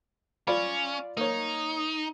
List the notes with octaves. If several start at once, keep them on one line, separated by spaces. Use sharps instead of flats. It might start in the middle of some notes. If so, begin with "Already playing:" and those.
C#4 F4 D5 B5
A#3 D#4 C#5